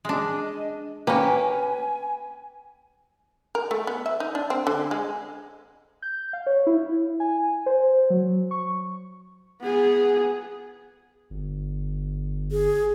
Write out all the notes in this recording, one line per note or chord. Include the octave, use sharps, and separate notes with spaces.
G#3 D4 D#5
A#3 C#4 G4 B4 G#5
A#4
A3
B3
E5
D#4
D4
C4
D3
G#3
G6
F5
C#5
E4
G#5
C5
F#3
C#6
B3 G#4
G1
G#4